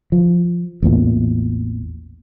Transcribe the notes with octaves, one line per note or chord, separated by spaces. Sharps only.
F3
A1 E2 A#2